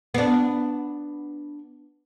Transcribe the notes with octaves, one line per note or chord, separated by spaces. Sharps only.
B3 D4